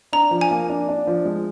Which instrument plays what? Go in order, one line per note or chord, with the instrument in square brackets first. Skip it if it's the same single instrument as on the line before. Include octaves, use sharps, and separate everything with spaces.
[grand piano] D4 [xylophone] A#5
[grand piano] F3
[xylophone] G#5
[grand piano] A#3
D4
D4
F3
G#3